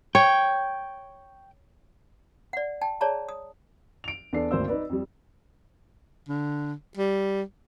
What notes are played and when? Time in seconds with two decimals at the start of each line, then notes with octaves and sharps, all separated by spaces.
0.15 C#5 G5
2.53 D5 F#5
2.81 G5 A5
3.01 G#4 C#5 D5 A5 A#5
3.29 D#6
4.04 D7 F7
4.33 E2 D4 A4 D5 C7
4.51 G#1 D2 A#3 C5 D5 E6
4.68 D#4 B4 D5
4.90 F2 G3
6.29 D3
6.97 G3